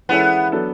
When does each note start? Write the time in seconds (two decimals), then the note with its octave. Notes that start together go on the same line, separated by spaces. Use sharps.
0.09 E3 G#3 B3 C#4 E4 A4
0.52 F#3 B3 D4 A4